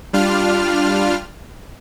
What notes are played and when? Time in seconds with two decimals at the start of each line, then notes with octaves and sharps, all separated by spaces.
0.13 G3 D4 F4 F6